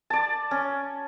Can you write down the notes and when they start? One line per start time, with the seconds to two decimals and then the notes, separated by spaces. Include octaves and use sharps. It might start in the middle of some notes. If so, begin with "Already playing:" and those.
0.10 D5 A5
0.51 C#4